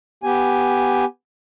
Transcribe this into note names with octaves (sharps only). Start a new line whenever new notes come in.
B3 G4 G#5